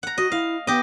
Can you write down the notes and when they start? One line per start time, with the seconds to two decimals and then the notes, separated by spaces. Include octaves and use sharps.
0.03 F#5 A#5
0.18 F#4 D#5
0.32 E4 F5
0.67 B3 G4 D#5